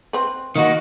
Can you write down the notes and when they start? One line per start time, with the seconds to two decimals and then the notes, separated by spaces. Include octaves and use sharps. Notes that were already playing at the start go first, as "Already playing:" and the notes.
0.13 C4 B4
0.56 D#3 A#3 F#4 D#5